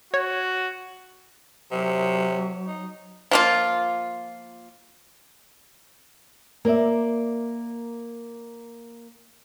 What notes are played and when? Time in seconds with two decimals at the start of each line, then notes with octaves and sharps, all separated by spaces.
0.14 F#4 C#5
1.71 C3 F#3
2.67 D#4
3.31 F3 A#3 F4
6.65 A#3 A#4 D5 E5